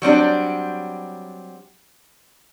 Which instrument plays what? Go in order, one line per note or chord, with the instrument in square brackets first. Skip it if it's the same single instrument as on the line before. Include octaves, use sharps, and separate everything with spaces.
[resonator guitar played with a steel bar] F#3 G3 C4 D4